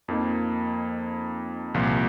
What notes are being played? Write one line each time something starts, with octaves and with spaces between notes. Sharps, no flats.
F2 F3 A#3 D#4
C2 A#2 F3